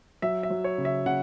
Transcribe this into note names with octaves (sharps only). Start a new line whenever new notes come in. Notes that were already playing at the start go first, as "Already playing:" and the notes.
F#3 E5
E5
F#3
C#5
C#3
E5
C#3 F#5